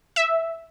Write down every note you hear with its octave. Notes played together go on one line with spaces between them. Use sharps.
E5